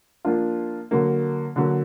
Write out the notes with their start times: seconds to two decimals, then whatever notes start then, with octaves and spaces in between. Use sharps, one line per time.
0.25 F3 A#3 D4 F4
0.91 D3 F#3 A#3
1.56 D3 F#3 A#3